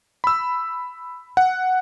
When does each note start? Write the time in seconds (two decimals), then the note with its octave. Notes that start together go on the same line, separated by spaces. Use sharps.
0.24 B5 E6
1.37 F#5